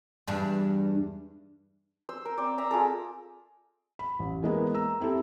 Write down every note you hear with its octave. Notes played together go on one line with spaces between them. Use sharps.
E2 G2 D4
C5 E6
A#4
C4 D5
E5 A#5 E6
F4 G#4 A4
B5
A1
E3 G#3 A#3 B3
A#5 E6
C4 E4 G4 A4